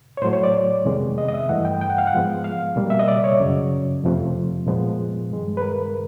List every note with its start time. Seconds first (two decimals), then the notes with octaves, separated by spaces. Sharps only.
0.17 C#5
0.22 A2 F#3 A3 C5
0.33 C#5
0.44 D5
0.85 F2 C3 D#3 G#3 B3
1.18 D#5
1.28 D#5
1.34 E5
1.49 G2 E3 A3 F#5
1.65 G5
1.81 G5
1.90 F#5
1.98 F5
2.07 F#5
2.13 G#2 F3 G#3 B3
2.44 F5
2.76 B2 G3 A#3
2.90 E5
2.99 D#5
3.08 D5
3.24 C#5
3.40 F#2 C#3 F#3
4.04 F2 C3 F3 A3
4.67 A#2 F3 G#3 B3
5.30 G2 D#3 G#3
5.57 B4
5.62 A#4